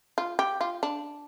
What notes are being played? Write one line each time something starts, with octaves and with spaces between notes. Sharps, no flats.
F4
G4
F4
D4